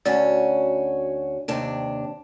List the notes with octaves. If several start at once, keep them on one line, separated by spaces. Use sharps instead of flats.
D2 C#4 F#4 D5
D#2 C3 D4